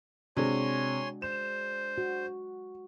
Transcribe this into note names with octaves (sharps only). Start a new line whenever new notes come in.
C3 G#3 D4 F#4 G#4 C#5 G#5 C6
C5 E7
F#4